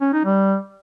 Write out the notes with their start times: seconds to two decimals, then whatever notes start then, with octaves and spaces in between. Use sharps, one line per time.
0.01 C#4
0.13 D#4
0.25 G3